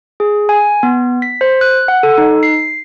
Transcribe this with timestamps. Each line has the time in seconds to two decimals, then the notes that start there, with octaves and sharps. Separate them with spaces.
0.20 G#4
0.49 G#5
0.83 B3
1.22 B6
1.41 C5
1.61 F#6
1.88 F#5
2.03 A4
2.18 D#4
2.43 C7